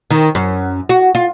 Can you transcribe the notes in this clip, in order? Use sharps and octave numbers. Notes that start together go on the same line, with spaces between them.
D#3
F#2
F#4
F4